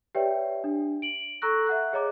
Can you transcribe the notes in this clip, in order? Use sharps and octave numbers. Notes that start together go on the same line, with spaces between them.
G4 B4 C#5 D5 E5 G5
D4
D7 F#7
A4 A#5 C#6 E6 F#6 A#6
E5 F#5 F#6
G#4 C#5 D#5 A#5 D6